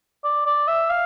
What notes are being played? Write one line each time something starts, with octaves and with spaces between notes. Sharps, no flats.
D5
D5
E5
F5